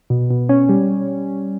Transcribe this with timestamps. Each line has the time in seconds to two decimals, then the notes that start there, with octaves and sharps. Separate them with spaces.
0.10 B2
0.30 B2
0.49 C#4
0.69 G3